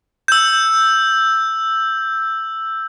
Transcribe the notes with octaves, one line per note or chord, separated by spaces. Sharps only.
E6 G6